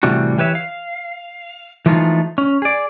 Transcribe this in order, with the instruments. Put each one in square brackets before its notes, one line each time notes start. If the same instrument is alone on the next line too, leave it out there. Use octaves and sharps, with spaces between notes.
[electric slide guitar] A2 C3 E3 G3 F#4
E3 G4 B4 C#5 E5
F5
E3 F3 G#3 A3 D#4 F4
C#4
G#4 D5